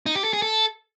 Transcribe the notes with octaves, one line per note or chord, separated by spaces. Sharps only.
D#4
G4
A4
G#4
A4